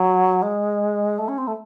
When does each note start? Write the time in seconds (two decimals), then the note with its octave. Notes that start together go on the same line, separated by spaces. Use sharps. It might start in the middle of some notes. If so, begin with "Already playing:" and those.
Already playing: F#3
0.42 G#3
1.18 A3
1.28 C#4
1.37 C4
1.47 A3